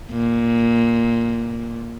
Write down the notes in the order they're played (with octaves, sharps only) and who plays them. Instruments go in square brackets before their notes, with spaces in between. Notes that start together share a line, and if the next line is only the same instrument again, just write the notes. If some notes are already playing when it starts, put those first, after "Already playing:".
[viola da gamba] A#2